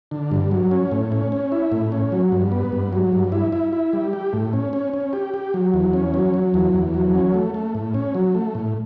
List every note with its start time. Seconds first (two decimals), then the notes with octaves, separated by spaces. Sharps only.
0.11 D3
0.31 G2
0.51 F#3
0.71 C#4
0.92 A2
1.12 C#4
1.32 C#4
1.52 E4
1.72 A2
1.92 C#4
2.12 F#3
2.32 G2
2.52 B3
2.72 G2
2.93 F#3
3.12 G2
3.32 E4
3.52 E4
3.73 E4
3.93 G3
4.13 G4
4.33 A2
4.53 C#4
4.73 C#4
4.93 C#4
5.13 G4
5.34 G4
5.54 F#3
5.74 E2
5.93 C#4
6.14 F#3
6.34 F#3
6.54 E2
6.74 E2
6.94 F#3
7.14 C#4
7.34 A3
7.54 A3
7.75 A2
7.94 C#4
8.15 F#3
8.35 A3
8.55 A2